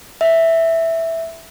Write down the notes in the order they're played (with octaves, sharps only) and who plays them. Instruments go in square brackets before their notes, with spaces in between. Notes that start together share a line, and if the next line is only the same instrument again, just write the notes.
[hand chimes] E5